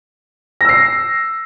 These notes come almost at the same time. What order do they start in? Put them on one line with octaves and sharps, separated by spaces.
A#6 E6 C7